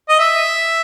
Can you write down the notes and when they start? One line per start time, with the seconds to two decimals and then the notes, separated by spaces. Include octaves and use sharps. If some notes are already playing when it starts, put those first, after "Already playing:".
0.09 D#5
0.19 E5